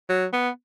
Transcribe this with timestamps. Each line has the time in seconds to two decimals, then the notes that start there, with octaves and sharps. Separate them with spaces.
0.10 F#3
0.33 B3